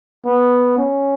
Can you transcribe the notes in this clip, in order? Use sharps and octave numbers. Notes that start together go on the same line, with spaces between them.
B3
C#4